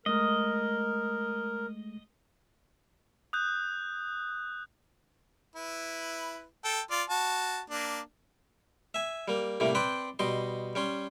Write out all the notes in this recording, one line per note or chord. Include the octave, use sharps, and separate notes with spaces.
G#3 A3 A#4 D#5
D#6 F#6 G6
E4 B4
A4 G5
F4 D5
F#4 A5
A#3 D4
E5 G#5
G3 A#3
A2 C3 G3 A#3
C4 B4 C5 D5 G5 C6
B2 G3 D#5 C6
G3 C#4 C6